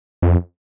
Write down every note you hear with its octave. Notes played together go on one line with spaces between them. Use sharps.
F2